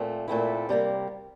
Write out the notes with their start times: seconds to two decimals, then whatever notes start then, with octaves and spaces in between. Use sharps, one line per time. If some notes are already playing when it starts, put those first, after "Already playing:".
Already playing: A#2 A3 C4
0.28 A#2 A3 C4 E4
0.69 C3 G3 A#3